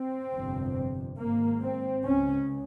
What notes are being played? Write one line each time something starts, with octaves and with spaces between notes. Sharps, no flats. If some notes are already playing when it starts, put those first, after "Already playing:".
Already playing: C4
G1 F2 C3
G#1 G#2 A#3
C4
C#2 C#3 C#4